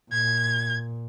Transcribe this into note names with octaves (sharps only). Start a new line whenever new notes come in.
A#2 G#6